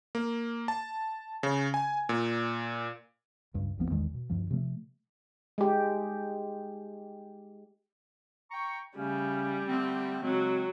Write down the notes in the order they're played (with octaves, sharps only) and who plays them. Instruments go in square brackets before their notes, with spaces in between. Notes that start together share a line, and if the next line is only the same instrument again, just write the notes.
[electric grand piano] A#3
A5
C#3
G#5
A#2
[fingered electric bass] C#2 G2
G#1 D#2 F3 B3
A1 E2 D#3 G#3
B2
D2 G2 E3 F3
C3 F3 A3
[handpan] G#3 G4
[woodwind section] G5 A#5 C#6
[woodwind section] C#3 A3 C#4 [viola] G3
[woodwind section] D3 A3 C4
[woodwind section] C#3 G#3 C4 [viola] F#3